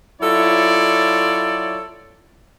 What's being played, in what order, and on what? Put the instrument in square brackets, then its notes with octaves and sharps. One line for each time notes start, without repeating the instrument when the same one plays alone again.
[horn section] F#3 E4 F4 A4 C#5 D5